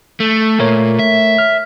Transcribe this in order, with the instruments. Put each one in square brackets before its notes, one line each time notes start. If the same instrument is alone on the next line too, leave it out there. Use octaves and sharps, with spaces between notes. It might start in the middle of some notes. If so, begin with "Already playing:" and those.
[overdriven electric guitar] A3
[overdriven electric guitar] A#2 [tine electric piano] A3 A#4 C#5
[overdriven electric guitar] E5
[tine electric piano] F6